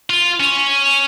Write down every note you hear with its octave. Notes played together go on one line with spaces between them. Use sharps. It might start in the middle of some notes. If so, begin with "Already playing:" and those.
F4
C#4